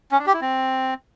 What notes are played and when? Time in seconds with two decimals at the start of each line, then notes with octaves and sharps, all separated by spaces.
0.11 C#4
0.19 D4
0.26 G4
0.34 E4
0.41 C4